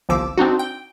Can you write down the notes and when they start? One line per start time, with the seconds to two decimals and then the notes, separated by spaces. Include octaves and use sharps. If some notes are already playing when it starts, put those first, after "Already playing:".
0.09 G1 C2 F3 D6 E6
0.38 C4 D4 D#4 F#4
0.59 G5